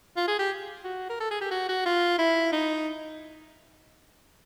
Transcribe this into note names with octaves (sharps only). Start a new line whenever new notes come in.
F4
G#4
G4
F#4
A#4
A4
G#4
G4
F#4
F#4
F4
E4
D#4